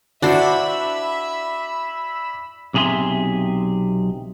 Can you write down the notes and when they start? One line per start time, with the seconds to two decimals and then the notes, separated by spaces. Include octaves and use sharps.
0.22 D4 E4 F#4 C5 D5 E5 B5 E6
2.74 B1 C3 G#4 A4 E5 C6